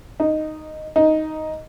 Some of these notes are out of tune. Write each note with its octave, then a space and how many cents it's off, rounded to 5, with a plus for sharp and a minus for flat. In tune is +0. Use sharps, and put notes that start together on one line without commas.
D#4 -5
D#4 +5